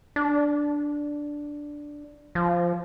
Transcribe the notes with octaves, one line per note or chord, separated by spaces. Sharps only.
D4
F3